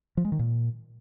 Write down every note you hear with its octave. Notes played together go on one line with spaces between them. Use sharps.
F3
G#3
D#3
A#2